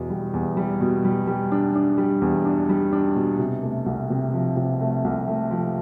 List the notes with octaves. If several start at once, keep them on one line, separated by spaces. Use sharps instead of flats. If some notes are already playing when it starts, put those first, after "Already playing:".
Already playing: E2 B2
G3
E2
G3
B2
G3
G3
D4
D4
G3
E2
D4
G3
D4
B2
C3
A3
C2
C3
F3
C3
A3
C2
A3
F3